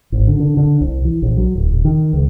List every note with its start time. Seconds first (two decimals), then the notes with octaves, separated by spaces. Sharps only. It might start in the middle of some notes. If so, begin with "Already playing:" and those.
0.12 G#1
0.27 D3
0.40 D3
0.57 D3
0.81 C2
1.05 E3
1.22 A#1
1.37 F#3
1.55 D1
1.72 D#1
1.85 D#3
2.13 C#2